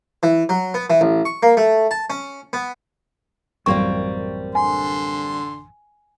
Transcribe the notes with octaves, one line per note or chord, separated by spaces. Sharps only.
E3
F#3
B3
E3
A1
C#6
A#3
A3
A5
C#4
B3
A1 F#2 G3 A#3 C4 C#6
D3 G#5 C6